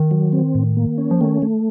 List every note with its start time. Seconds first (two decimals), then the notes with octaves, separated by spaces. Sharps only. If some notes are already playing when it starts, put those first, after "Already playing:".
Already playing: D#3
0.11 F#3
0.33 C4
0.55 A2
0.77 A#3
0.98 C#4
1.11 F3
1.21 D#3 A3
1.42 A3